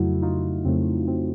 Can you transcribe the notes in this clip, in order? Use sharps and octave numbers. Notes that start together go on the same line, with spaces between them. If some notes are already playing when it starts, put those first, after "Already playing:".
Already playing: F2 C#3 F#3 A3 E4 F#4
D#4 F4
F2 C#3 F#3 A3 C4
C4